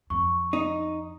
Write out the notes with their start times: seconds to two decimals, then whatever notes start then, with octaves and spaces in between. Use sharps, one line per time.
0.10 F2 C#6
0.53 D#4